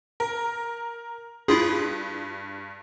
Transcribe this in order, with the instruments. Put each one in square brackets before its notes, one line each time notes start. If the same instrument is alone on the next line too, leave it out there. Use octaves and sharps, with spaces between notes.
[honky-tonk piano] A#4
[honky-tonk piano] G2 [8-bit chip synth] E4 F4 G#4